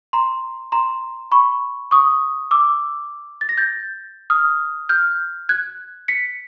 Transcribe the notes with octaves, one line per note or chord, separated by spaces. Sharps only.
A#5 C6
A#5 C6
B5 C#6
C#6 D#6
D6 E6
A6
A#6
G6 A6
D#6 F6
F6 G6
F#6 G#6
B6 C#7